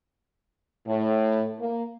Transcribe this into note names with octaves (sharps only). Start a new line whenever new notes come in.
A2
A#3